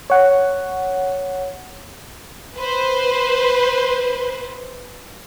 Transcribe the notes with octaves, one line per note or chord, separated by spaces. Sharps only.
C#5 F#5
B4 C5